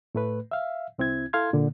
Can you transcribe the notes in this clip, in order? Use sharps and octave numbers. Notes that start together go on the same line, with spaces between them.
A2 A3 B4
E5 F5
C2 C4 E4 G#6
E4 A4 F5 C6 G#6
A#2 D3 A#3